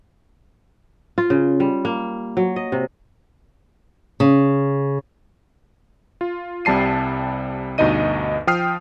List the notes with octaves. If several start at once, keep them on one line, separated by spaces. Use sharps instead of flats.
F4
C#3
G3
A#3
F#3
D#5
C3
C#3
F4
C2 C3 G3 A5 C7 D#7
D2 G2 B2 D#4 D#5 D#7
F3 G5 D#6 F6 C7